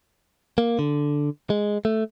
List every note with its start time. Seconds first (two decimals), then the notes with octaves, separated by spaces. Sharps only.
0.58 A#3
0.79 D3
1.50 G#3
1.85 A3